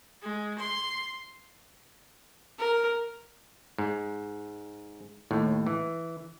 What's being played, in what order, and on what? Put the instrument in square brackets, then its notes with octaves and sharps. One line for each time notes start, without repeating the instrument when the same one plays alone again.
[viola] G#3
C6
[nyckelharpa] A#4
[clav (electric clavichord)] G#2
D#2 A2
E3